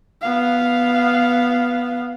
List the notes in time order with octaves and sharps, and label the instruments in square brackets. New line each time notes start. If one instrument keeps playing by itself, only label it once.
[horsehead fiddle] B3 F5